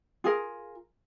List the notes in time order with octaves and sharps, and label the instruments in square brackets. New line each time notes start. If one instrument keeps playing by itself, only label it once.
[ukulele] F4 G#4 A#4